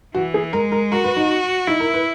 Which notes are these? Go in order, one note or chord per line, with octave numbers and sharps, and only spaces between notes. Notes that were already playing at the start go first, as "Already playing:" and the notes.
E3 F#4
G#4
G#3 A#4
A#4
F#4 A#4
B4
D#4
D#4 E4
A#4
B4